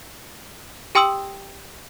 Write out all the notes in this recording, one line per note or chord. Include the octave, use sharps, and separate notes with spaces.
G4 G5 C6 D#6 E6 F#7